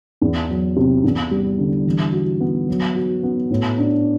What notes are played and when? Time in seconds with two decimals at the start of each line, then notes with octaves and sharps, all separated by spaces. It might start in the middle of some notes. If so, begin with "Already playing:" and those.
0.21 E2
0.50 F#3
0.76 C3
1.04 E2
1.31 G3
1.59 D3
1.86 E3
2.13 F#4
2.40 B3
2.68 F#3
2.96 F#4
3.23 B3
3.51 A2
3.78 D4